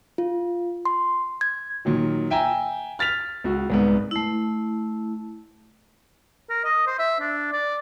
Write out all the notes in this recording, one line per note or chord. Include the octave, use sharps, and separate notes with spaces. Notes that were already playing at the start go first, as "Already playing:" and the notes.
F4
C6
G#6
A#2 D#3 F#3
E5 G5 G#5 A#5 E6
F6 A6 B6 F7
C#2 F#4
C2 G#2 B3
A3 E4
A#4
D#5
C5
E5
D4
D5